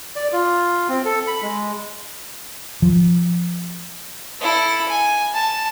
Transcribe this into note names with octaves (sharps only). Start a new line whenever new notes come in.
D5
F4
C4
A4
B5
G#3
F3
E4 A4
G#5
A5